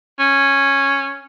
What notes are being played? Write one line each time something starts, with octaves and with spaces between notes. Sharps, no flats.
C#4